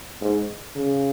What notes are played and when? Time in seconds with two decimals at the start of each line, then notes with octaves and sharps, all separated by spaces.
0.21 G#2
0.75 C#3